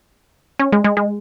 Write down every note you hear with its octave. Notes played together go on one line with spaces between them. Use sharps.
C#4
G#3
G#3
G#3